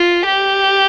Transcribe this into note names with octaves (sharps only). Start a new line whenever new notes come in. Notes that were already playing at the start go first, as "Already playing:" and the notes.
Already playing: F4
G4